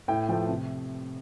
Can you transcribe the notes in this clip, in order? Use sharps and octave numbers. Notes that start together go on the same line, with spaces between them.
A2 G5
F3 A3 G5
C3